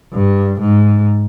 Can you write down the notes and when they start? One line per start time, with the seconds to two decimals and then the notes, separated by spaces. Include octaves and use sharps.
0.13 G2
0.60 G#2